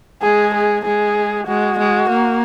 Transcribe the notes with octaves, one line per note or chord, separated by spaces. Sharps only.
G#3 G#4
G#4
G#3 G#4
G#3 F#4
G#3
A#3